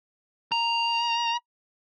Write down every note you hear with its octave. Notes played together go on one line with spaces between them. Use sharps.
A#5